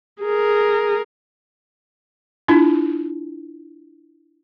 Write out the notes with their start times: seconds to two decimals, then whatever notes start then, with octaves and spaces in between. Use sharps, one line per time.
0.22 G#4 A#4
2.48 D4 E4 F4